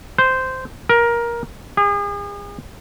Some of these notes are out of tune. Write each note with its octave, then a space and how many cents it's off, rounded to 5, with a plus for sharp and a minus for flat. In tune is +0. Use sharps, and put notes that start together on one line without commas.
C5 -10
A#4 +15
G#4 -40